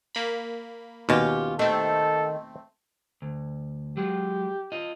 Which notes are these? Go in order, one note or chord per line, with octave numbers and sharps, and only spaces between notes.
A#3 B5
D#2 B2 C#4 F4 G4
D#3 A3 C4 A4
D2
F#3 G#3 G4
F4 D#5